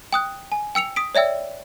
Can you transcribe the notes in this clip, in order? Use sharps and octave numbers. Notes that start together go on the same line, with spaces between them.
G5 D#6 F#6
G#5
G5 E6 C#7 F7
D#6 B6 D7
C#5 D5 E5 G5 E6